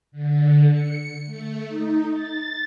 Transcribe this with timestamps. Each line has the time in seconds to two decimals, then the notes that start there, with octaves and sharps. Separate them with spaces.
0.12 D3
0.69 C#7
1.25 A3
1.68 D#4
2.12 A6